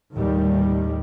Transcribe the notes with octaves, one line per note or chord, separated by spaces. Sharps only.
D#2 A2 D#3 G3